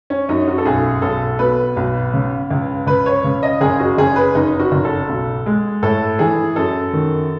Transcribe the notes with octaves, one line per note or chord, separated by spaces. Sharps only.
C#4
F#2 D#4
F#4
A4
B1 G#4
B1 A4
B2 B4
B1
C#3
C#2
C#2 B4
C#5
C#3
D#5
F#1 G#4
F#4
F#1 G#4
B4
F#1 D#4
F#4
F#1
A4
B1
G#3
A2 A4
E3 G#4
F#2 A4
D#3